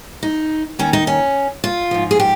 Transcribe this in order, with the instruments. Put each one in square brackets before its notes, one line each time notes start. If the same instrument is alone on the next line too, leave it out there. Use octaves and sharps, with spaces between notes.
[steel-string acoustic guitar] D#4
D#2 D#3 C#4
D#4
C#4
F4
G#2 F3
G#4
G4